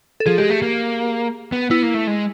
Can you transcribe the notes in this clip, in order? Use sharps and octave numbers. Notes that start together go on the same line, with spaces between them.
A4
F3 G#4
G#3 G4
A3
A#3
B3
B3 E4
A#3
A3
G#3